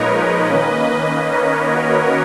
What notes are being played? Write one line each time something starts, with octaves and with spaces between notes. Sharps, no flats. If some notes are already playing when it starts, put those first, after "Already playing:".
Already playing: A#2 F3 G#3 D#4 A#4 B4 C#5 D#5
D#3 A#3 C#4
A#4 C#5
F#4 A#4